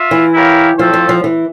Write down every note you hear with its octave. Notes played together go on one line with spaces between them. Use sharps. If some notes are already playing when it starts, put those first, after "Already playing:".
Already playing: F4 E5
E3
E4 G4 A#4 C#5 F5
F3 A3 C4 F4 A4 C5
F3
F3
E3